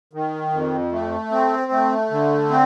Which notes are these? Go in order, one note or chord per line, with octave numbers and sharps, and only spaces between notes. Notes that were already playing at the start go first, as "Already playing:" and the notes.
D#3
F2
A3
C4
A3
D3
C4